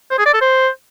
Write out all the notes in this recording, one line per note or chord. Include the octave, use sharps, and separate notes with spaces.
C5
G#4
D5
A4
C5